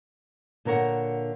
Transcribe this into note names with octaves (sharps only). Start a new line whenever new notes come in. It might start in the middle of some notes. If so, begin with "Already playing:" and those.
A#2 D3 A#4 C#5 F#5